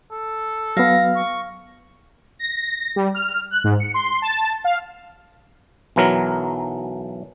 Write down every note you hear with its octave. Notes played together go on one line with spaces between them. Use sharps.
A4
F#3 B3 F5 A#6
C#6
A#6
G3
F6
F#6
G#2
C#7
C6
A5
F5
B1 E3 F#3 A#4